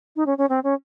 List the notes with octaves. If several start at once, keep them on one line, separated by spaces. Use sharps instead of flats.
D#4
C#4
C#4
C4
C#4